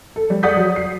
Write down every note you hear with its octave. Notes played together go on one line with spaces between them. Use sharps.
A4
G3
D5 F#5 D#6 G6 B6
F#3
C7